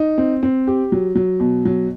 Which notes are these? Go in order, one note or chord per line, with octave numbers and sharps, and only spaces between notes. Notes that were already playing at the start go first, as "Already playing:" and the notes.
Already playing: D#4
C4
C4
G4
F#3
F#3
B2
F#3